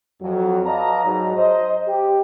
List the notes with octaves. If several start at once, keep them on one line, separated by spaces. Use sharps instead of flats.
F2 F#3
B4 D5 D#5 F5 A5 A#5
G#2 F#3
C5 D#5
G4